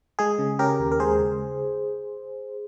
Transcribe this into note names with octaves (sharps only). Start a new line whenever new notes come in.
G#3 G#4
C#3
C#4 G4 A#4
D#2
A#4
G#3 G#4 C5
C#3